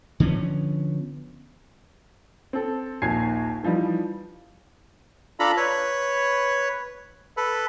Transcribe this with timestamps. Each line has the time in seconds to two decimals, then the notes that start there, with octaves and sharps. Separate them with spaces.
0.20 D3 F3 B3 C#4
2.53 C4 A4
3.02 A#1 D#2 G#5 G#6 C7
3.63 E3 F3 G3 D#4
5.40 D4 F4 A4 A#5 B5
5.57 B4 C#5
7.37 A4 B4